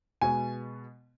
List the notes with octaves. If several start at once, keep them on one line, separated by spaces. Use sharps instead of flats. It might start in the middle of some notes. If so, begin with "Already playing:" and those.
B2 G#3 B3 G#5